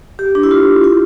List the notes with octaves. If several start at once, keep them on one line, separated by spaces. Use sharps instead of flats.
G4
D4
E4
F4
E4